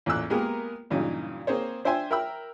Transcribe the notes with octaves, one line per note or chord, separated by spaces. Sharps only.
A1 E2 A#2 E6 F#6
G#3 A#3 B3 G4 G#4 A#4
G2 A#2 C#3 E3 F#3 D#4
A#3 C4 G#4 C5 C#5
D4 C5 E5 G5 G#5 C6
A#4 E5 G5 B5 E6